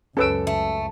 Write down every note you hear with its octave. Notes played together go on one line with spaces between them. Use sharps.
C#2 F#2 C#4 A4 B4 E6 D7
A3